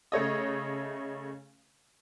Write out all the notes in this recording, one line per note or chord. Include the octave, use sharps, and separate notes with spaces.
C#3 A3 C#5 D#5